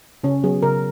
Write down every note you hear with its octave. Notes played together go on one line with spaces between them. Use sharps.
C#3 C#4
F#3 B3 G#4
C#3 A#4